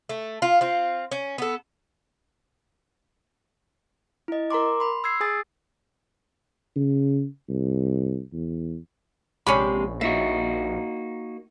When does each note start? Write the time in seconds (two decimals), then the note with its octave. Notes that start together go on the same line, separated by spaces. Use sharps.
0.09 A3
0.42 F4
0.61 C4 F4
1.11 C#4
1.38 B3 A4
4.28 E4 D#5
4.50 A#4 A#5 C6 D6
4.80 B5 C6
5.04 E6 G#6 C7
5.20 G#4 G#5 D#6 A6
6.76 C#3
7.48 C2
8.33 E2
9.47 A#1 C3 G#3 C#4 D4 B5
10.01 A#3 D#4 F#4 E5